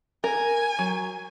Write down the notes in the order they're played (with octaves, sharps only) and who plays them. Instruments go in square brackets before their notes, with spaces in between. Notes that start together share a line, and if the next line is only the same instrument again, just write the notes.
[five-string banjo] A#4 [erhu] G#5
[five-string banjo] F#3